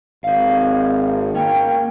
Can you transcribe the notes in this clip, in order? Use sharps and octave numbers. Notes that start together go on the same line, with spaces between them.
G#1 C4 F5
A#3 C#4 G5